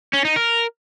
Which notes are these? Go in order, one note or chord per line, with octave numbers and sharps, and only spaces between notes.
C#4
D#4
A#4